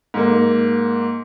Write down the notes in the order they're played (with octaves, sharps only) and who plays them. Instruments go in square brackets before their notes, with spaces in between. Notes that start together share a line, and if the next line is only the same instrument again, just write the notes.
[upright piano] G#2 A#3